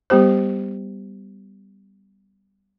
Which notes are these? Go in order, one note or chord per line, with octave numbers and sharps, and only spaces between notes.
G3 B3 G4 C5